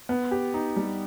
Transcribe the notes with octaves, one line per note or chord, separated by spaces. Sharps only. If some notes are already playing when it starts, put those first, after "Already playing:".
B3
G4
D#4
G3